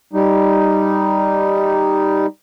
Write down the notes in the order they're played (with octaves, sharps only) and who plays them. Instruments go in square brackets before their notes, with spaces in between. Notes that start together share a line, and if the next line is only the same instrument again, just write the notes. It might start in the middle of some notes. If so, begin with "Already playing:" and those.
[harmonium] G3 D#4